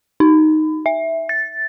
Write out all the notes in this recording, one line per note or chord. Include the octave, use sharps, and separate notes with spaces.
D#4
E5
A6